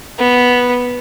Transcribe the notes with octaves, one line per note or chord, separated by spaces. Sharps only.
B3